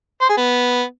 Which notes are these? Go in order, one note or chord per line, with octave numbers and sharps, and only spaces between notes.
C5
G#4
B3